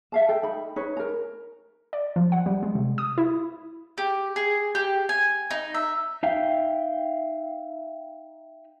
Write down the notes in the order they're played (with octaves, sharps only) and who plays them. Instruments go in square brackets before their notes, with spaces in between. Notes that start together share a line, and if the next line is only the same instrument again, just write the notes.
[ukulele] E5 F5 A5
A4 G5
D#4 B5
D#4 B4 C#5
A#4 A#5
[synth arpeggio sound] D5
F3
F#5
G3
G#3
C3
D#6
E4
[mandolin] G4
G#4
G4
G#5
D#4
E5
[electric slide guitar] D#4 E5 F5 G5